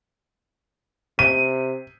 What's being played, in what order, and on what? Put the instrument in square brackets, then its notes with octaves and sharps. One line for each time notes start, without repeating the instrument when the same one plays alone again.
[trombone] C3 [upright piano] D#7